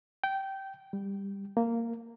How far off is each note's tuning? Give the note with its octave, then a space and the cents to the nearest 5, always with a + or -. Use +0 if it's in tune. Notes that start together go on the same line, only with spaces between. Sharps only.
G5 -15
G3 +15
A#3 -10